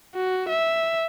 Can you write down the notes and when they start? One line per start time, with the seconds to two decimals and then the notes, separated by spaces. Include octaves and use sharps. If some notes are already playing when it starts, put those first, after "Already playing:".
0.15 F#4
0.49 E5